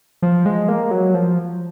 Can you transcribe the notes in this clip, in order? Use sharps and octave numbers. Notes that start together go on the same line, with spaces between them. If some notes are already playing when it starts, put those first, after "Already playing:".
F3
G#3
A#3
F#3
F3